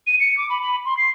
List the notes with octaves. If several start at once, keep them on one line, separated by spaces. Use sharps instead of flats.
D#7
C#7
D6
B5
B5
C6
C7